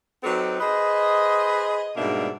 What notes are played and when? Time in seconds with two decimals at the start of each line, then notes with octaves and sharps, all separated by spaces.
0.23 F#3 C4 D#4 G4 A4 B4
0.60 G#4 B4 C5 D#5
1.96 G#2 B2 G3 A#3 D4 E5